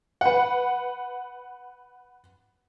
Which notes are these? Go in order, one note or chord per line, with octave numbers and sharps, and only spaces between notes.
B4 F#5